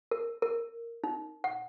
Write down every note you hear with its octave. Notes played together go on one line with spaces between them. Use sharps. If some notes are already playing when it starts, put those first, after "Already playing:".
A#4
A#4
D#4
F#5